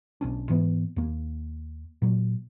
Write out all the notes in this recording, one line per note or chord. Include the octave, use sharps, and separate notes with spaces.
B1 C#4 D4
G#2 E3 B3
D#2 A#3
A#2 F#3